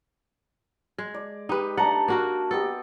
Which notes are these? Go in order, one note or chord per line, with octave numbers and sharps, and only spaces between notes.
G#3
D5
D#4 G4 B4
A3 D4 F#5 A5 A#5
A#3 F#4 A#4
B3 G4 A4 D#5